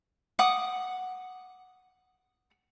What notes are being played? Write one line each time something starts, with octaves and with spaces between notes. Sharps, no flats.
F#5 D6 D#6